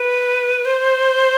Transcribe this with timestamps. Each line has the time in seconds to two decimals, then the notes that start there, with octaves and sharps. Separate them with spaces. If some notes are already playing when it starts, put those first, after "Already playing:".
Already playing: B4
0.65 C5